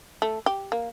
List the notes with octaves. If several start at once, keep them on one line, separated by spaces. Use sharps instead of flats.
A3
G4
A#3